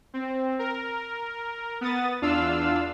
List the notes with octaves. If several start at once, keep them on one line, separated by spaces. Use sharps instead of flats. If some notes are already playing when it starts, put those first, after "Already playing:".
C4
A#4
B3 D#6 A6
E2 D4 F4 F5 E6